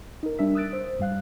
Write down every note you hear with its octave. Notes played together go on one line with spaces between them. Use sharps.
D#4 A#4
G3 D4 A#4 E5 E6 B6
D#6 E6 F#6 A6 D7
C5
G2 G3 F5 F#6